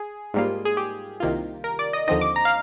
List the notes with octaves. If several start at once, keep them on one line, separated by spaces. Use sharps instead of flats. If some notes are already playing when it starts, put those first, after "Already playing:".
Already playing: G#4
G#2 G3 A#3 F4
G#4
G4
C2 C3 D#3 A#3 F4
A#4
D5
D#5
D#2 D3 F3 C4 D#4 D#5
D6
A#5
F5